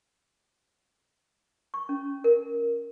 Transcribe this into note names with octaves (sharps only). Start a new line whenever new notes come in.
C#6
C#4
A#4